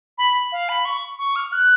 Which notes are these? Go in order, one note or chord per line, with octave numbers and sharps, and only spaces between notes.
B5
F5
B5
C#6
C#6
F6
F#6